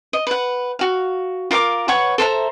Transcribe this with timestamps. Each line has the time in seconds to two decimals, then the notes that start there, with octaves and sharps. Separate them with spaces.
0.13 D#5
0.27 B4 F#5
0.79 F#4 F5
1.51 F4 A#4 F5 D6
1.88 B4 C#5 F#5 C#6
2.18 A4 C5 E5 A#5